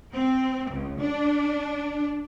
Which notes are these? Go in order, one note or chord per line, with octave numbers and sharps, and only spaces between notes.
C4
C#2
D4